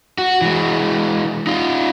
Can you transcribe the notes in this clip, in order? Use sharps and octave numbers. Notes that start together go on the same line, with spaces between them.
F#4
E3 G#3
D#4 F4